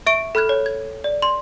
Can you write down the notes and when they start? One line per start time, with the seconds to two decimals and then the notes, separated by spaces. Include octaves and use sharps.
0.07 E5 C#6 D7
0.35 A4 B5 F6 F#6 G#6
0.49 C#5
0.66 G#6
1.04 D5
1.22 C6